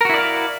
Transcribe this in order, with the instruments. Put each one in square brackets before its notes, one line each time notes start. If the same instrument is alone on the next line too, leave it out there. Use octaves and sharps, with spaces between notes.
[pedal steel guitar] A#4
F#4
E4
D5
F5